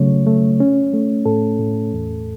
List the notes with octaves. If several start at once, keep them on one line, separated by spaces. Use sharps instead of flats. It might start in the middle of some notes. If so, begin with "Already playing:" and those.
Already playing: C#3 F#3 A3 C#5
A3
C#4
A3
A2 A4
A2
E2